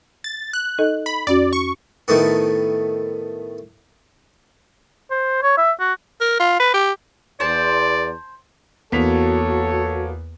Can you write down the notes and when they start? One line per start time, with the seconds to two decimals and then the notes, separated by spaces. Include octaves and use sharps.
0.24 A6
0.53 F#6
0.79 D#4 A4 D#5
1.06 B5
1.27 F2 C#4 F#4 D5
1.53 C#6
2.08 A2 D#3 A3 B3
5.11 C5
5.43 C#5
5.57 E5
5.80 F#4
6.21 A#4
6.40 F4
6.60 B4
6.74 G4
7.40 E2 C5 D5 A5
8.92 E2 A#3 B3 F#4 A4 C#5 B6 F7